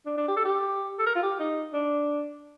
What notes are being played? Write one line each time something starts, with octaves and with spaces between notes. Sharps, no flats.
D4
D4
G4
A4
G4
A4
A#4
F4
G4
D#4
D4